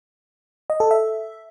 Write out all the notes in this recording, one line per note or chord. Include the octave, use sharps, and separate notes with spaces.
D#5
A4
E5